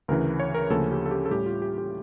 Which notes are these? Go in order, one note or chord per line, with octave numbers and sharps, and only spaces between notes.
D2 C#3 E3 A#4
C#5
A#4
D2 C#3 F3 A#3 C#4 A4
G4
A4
G4
A4
A2 G3 C#4 G4
F4
G4
G4